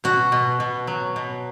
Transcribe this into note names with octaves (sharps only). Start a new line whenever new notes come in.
B2 F#4
B2
B2
F#3
B2